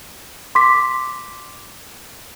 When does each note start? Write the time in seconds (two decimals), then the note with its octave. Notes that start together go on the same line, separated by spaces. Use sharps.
0.55 C6 D6 B6